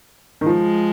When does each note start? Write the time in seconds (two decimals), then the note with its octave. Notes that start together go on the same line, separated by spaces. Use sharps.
0.41 D#3
0.46 F3 G#3